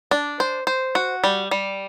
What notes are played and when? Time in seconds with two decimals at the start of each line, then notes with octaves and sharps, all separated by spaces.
0.11 D4
0.40 C5
0.67 C5
0.95 F#4
1.24 G3
1.51 G3